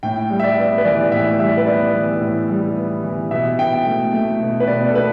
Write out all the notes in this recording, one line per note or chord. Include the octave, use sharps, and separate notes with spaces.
A2 G5
G3
E5
D5
B3
B4
E3 D5
A2 E5
G3 E5
D5
B4
B3 D5
E3
A2
G3
B3
E3
B2 E5
B2 G5
A3
A3
B2
B4
B2 D5
A4
A3 B4